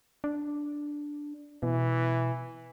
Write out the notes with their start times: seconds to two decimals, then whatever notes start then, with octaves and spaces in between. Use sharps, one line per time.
0.24 D4
1.63 B2 E3